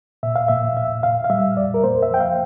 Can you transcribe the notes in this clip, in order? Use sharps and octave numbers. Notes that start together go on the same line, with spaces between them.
A#2 E5
F5
A#2 E5
A#2 E5
A#2 F5
F5
G3 E5
F2 D5
A#4
A#3 C5
E5
F3 G5
F5